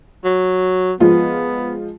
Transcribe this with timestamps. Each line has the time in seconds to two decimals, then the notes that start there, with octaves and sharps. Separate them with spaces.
0.24 F#3
1.00 F3 G#3 B3 F4